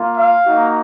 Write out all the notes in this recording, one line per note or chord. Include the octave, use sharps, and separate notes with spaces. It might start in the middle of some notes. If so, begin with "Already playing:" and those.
Already playing: A#3 F4
F5
A#3 D#4 F#4